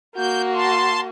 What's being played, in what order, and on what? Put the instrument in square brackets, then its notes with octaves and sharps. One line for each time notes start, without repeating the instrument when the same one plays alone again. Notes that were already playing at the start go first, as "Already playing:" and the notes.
[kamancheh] A#3 F#4 [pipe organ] G6
[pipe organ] A5 C6